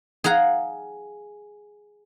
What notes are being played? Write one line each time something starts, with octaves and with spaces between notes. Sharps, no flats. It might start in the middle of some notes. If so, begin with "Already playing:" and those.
G#4 F5 F#5 A#5